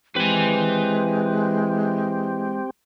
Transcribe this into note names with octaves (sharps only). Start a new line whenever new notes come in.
E3 G#3 C4 G4 B4 G#5